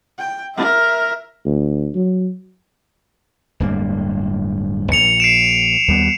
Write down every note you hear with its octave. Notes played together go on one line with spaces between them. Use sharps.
G5
A#4 E5
D2
F#3
D1 G2 A#3
A#1 C#7 F7
C7 D7 E7
D#2 G3 B3